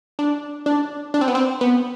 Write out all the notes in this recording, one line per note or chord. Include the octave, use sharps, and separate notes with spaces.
D4
D4
D4
C4
B3
C4
B3